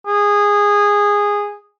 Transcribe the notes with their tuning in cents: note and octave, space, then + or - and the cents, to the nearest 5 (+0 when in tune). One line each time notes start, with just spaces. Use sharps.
G#4 -15